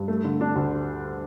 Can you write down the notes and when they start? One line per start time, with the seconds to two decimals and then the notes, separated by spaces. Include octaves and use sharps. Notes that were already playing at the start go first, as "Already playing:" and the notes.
Already playing: G2
0.08 A3
0.24 D3
0.41 D4
0.56 D2